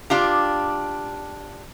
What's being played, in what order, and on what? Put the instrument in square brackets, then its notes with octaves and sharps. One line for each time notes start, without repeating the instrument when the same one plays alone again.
[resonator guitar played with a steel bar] D4 F4 G4